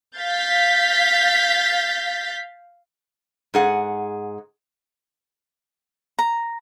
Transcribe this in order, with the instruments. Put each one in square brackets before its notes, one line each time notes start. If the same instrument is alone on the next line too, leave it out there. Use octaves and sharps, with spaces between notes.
[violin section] F5 G6 A6 B6
[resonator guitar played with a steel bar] G#2 G#4 F#5
[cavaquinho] A#5